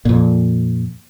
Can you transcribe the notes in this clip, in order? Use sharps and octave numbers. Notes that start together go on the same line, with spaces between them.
F2 A#2